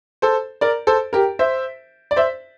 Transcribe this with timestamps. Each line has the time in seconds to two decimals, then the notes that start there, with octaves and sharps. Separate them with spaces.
0.22 A4 C5
0.61 A#4 D5
0.87 A4 C5
1.13 G4 A#4
1.39 C5 E5
2.11 D5
2.16 C5 E5